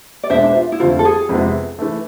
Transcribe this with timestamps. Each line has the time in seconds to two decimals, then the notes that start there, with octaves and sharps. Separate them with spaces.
0.24 D5
0.30 E2 B2 G#3 B3 D4 C5 E5
0.55 F4
0.72 E4
0.80 F2 D3 A3 C4 F4
0.99 A4
1.05 G#4
1.29 F2 C3 G#3 B3 E4
1.79 E3 A3